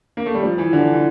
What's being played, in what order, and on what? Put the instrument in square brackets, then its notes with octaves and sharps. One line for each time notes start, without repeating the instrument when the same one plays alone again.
[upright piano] A#3
A3
G3
F3
E3
D3
E3